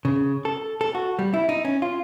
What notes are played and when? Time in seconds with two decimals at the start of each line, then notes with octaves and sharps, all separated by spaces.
0.05 C#3
0.45 A4
0.81 A4
0.95 F#4
1.19 G3
1.34 E4
1.49 D#4
1.65 C#4
1.82 F4